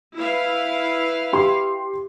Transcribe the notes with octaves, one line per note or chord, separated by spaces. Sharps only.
E4 B4 F5
G4 C6